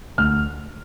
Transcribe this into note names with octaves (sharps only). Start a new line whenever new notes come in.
D2 F6